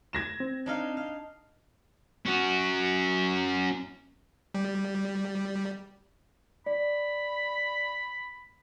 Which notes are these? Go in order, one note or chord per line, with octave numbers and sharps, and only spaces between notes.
G#6 A#6 E7
C4
D4 D#4 F5
F5
C#4 F#4
G3
D5 B5